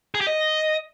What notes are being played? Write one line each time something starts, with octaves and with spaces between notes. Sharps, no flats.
G#4
G4
D#5